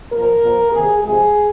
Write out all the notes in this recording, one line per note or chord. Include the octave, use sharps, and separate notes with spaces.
A#2 F3 A#3 A#4
A#2 F3 A#3
C3 D#3 A#3 G#4
C3 F3 G#3 G#4